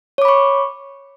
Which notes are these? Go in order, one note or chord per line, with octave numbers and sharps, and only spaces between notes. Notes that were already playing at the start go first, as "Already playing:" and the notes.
C#5 B5 C#6 D6